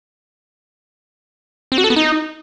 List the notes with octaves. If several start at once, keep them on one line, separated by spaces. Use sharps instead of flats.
C4
F#4
A4
B3
D#4